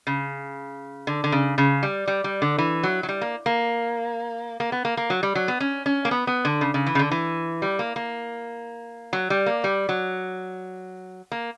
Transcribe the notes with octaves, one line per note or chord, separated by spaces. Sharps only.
C#3
D3
D3
C#3
C#3
G3
G3
G3
D3
E3
F#3
F#3
G3
A#3
A#3
A#3
B3
A#3
A#3
F#3
G3
F#3
B3
C#4
C#4
A#3
B3
B3
D3
C#3
C#3
E3
C#3
D3
E3
G3
A#3
A#3
F#3
G3
A#3
G3
F#3
A#3